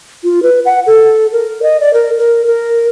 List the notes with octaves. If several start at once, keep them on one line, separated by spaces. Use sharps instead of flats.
F4
B4
F#5
A4
A#4
D#5
D5
A#4
A#4
A#4